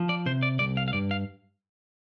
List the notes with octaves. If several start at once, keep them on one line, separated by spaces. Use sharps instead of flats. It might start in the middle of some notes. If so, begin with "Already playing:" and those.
Already playing: F3
D5
C3 C5
D5
C2 D5
F5
F5
G2 D5
F5